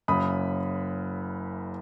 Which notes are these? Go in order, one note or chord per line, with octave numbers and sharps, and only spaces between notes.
F#1 F#2 C#3 B5 D#6